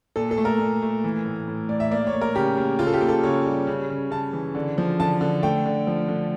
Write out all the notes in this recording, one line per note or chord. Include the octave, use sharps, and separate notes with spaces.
A#2 A4
A4
A3
A#4
A#2
A3
E3
A2
A2
A2 D5
E5
A#3 D5
C#5
A#3
A#4
C#3 G4
A#3
C#3 F4
A4
G4
A#3
A4
C#3 C#5
G3
C#3
C#3
C#3 A5
E3
D3
F3
D3 A5
D3
A3 G5
D3
F3
D3